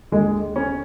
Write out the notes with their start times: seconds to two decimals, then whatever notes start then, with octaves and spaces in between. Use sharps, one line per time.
0.12 D#2 D3 G#3
0.56 C#4